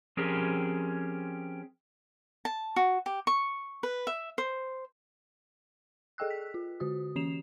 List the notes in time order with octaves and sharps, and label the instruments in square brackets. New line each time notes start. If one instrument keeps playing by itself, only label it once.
[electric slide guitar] F3 C4 C#4 G4 G#4 A#4
[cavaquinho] A5
F#4
G4
C#6
B4
E5
C5
[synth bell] G#4 A4 D#5 G5 E6 F#6
B6
F4
D3 F#4 D#6
E3 C#4 C7 E7 F7